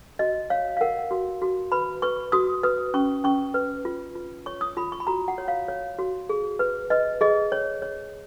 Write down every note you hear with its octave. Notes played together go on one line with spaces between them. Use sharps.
F#4 D#5
C#5 F5
F5
A#4 F#5
F#4
F#4
B4 B5
B4 C#6
F#4 D#6
B4 D#6
C#4 C#6
C#4 C#6
B4
F4
F4
C#5 C#6
D#6
F4 B5
C#6
B5
F#4 A#5
F#5
C#5
F5
C#5
F#4
G#4
B4
B4 D#5
G#4 D#5
C#5
C#5